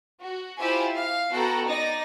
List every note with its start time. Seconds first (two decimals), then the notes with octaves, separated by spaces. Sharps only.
0.19 F#4
0.57 E4 F4 G4 C5 E5 G#5
0.96 F5
1.31 B3 F#4 A4 G5 A#5
1.65 D#4 D5 A#6